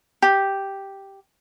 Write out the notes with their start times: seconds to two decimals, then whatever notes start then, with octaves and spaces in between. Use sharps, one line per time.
0.22 G4